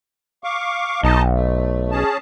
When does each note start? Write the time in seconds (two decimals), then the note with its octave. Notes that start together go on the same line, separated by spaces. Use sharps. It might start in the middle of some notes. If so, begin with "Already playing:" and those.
0.44 F5 C#6 D6
1.03 B1 D#4 D#5 A5
1.34 A3
1.91 C#4 G#4 A5